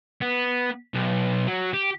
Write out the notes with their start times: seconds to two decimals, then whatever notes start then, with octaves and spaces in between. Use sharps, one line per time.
0.21 B3
0.94 B1
1.47 F#3
1.74 G4